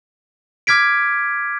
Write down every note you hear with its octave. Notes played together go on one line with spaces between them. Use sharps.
D6 F6 G#6 B6 D7